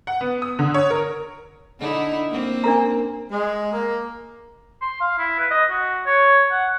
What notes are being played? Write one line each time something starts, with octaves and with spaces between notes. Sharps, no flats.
F#5
B3
D#6
D3
C#5
A#4
D3 D#4 E4
A#3 C4
D4 A#4 A#5
G#3
A#3
C6
F5
E4
B4
D#5
F#4
C#5
F#5